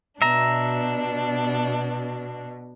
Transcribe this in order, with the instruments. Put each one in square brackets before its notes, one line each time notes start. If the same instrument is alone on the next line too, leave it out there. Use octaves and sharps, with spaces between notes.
[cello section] B2 [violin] D4 [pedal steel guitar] E5 A#5